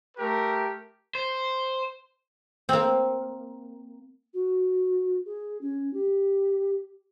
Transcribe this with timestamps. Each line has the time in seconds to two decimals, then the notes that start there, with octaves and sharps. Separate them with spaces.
0.18 A3 G4 A#4
1.15 C5
2.69 A#3 C4
4.34 F#4
5.25 G#4
5.61 C#4
5.93 G4